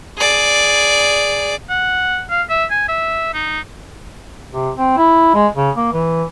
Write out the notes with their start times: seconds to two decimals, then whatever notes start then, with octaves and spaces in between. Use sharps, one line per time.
0.18 G#4 D5
1.70 F#5
2.30 F5
2.50 E5
2.71 G#5
2.88 E5
3.34 D#4
4.52 C3
4.76 C4
4.97 E4
5.34 G#3
5.55 C#3
5.76 A#3
5.92 E3